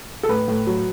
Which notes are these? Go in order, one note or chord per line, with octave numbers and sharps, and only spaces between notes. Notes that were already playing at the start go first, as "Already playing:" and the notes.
A4
A2 B4
A2
F#3